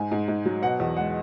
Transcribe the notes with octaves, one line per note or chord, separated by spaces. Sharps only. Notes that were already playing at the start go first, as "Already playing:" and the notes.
Already playing: G#2 G#5
G#2
G#2
F#3
B2 F#5
E2
G#3 F#5